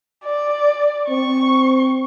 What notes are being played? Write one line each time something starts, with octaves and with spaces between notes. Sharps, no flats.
D5
C4 C#6